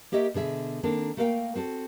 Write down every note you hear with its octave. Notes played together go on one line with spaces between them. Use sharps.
A#3 G4 C#5 D#5 E5
B2 D3 G#4 E5
D#3 A#3 C4 D4 A4
A3 A#3 A#4 D5 F5 G5
C4 F#4 A4